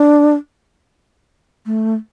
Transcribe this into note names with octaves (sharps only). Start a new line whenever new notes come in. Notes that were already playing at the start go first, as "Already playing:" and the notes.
Already playing: D4
A3